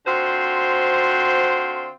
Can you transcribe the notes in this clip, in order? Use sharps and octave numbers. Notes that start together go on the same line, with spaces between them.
D3 C4 F4 F#4 C5